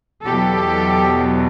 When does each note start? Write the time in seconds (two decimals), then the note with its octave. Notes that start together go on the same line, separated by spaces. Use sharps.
0.25 E2 B2 F#3 G4 A4